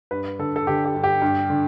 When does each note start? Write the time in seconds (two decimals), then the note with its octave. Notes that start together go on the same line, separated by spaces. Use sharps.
0.11 G2 B4
0.39 D3 A4
0.56 A4
0.67 D3 G4
0.85 G4
0.95 G2
1.03 G4
1.22 G2
1.50 D3